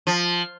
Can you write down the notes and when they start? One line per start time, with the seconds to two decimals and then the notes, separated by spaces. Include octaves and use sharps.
0.07 F3